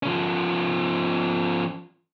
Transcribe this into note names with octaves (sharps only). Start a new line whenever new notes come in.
F3 C#4